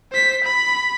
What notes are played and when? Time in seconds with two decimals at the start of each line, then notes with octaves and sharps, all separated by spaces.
0.12 C5 B6
0.44 B5